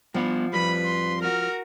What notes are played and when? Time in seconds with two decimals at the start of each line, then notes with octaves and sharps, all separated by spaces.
0.14 F3 G3 B3 F#5
0.53 F2 G3 B4 B5
0.85 C6
1.22 F#4 A#4 F6